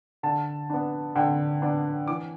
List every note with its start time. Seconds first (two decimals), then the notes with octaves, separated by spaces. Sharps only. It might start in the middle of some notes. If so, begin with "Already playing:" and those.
0.23 D3 A5
0.70 B3 D4
1.15 D3 G5
1.62 B3 D4
2.08 E3 D6